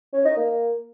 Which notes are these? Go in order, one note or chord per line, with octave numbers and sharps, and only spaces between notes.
C#4
D#4
A#3